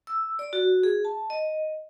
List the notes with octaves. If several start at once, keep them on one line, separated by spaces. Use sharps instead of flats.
E6
D5
F#4
G#4
A5
D#5